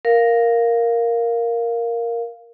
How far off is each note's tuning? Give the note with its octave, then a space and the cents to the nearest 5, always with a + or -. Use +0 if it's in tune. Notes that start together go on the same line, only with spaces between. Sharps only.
A#4 +0 F5 +0